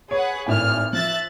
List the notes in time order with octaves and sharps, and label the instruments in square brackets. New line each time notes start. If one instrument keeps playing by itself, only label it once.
[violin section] G#4 B4 F#5 [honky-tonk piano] C#5
[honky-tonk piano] G#1 A2 G#5 [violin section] F6
[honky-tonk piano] F3 [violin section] E5 F#6 A6